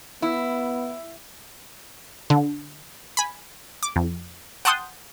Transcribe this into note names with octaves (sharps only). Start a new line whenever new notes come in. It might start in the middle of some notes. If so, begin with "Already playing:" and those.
B3 E4
D3
G#5 B5
D6
F2
F#5 G5 A5 C6 D#6 G6